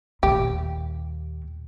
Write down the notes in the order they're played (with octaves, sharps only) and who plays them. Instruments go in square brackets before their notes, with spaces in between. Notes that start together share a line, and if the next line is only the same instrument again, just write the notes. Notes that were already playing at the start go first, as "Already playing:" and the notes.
[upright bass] D#2 A#2 [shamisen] G4